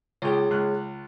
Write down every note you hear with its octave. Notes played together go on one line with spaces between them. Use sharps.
C#2 G#4 C#5 G5
C#2 F#6